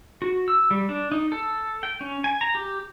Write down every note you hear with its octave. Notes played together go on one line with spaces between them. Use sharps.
F#4
E6
G3
D4
D#4
A4
G5
C#4
G#5
A#5
G4